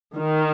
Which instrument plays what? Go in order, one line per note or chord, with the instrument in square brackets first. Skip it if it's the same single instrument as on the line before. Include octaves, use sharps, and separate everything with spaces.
[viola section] D#3